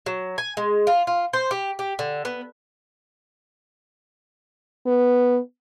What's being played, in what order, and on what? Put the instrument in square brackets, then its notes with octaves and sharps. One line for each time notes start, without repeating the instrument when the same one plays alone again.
[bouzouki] F#3
G#5
G#3
F4
F4
C5
G4
G4
D3
B3
[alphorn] B3